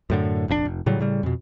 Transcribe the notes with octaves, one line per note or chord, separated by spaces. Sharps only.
F#2 A2 D3
F1 A#1 A2 D4
F1
A2 C#3 F#3 G3
A2 C#3 G3
F2 B2